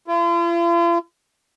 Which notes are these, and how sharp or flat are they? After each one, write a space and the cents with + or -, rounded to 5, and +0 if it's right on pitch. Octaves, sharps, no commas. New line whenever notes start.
F4 -45